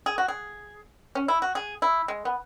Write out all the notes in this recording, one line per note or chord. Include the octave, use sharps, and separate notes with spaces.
G#4
F#4
G#4
C#4
E4
F#4
G#4
E4
G#3
B3